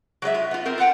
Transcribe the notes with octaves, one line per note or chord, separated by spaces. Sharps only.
F#3 G#3 D5 E5
F4
B3 F4
C4 A#4
F4 B4 F#5 G5